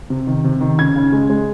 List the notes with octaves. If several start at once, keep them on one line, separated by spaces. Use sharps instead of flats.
C3
D#3
C3
D#3
C#3 G#6
C#3
G#3
G#3